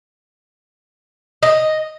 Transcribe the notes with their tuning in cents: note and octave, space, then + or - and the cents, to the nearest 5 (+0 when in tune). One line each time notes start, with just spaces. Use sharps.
D#5 +0